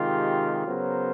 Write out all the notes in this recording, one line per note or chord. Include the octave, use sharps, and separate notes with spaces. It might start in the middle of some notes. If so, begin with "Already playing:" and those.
Already playing: C3 D#3 G#3 F4 G4
C#3 F#3 B3 A#4 C5